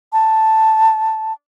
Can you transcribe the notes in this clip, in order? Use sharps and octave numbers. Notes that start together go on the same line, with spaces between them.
A5